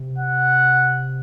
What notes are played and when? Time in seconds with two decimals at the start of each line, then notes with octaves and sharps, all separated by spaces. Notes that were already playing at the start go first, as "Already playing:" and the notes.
Already playing: C3
0.18 F#5